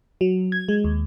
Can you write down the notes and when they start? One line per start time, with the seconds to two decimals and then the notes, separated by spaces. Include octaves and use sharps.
0.21 F#3
0.52 G#6
0.68 G#3
0.84 D#2